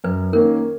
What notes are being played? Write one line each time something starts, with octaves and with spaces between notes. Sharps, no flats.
F#2 B4
D#3 A#3 C#4 A#4